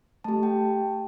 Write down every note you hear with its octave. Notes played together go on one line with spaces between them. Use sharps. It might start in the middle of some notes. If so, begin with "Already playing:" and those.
A3 G4 A5
G5